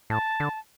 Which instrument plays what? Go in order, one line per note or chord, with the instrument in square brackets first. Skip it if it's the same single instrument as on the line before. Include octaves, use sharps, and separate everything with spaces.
[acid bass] A2 [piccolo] A5
[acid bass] D3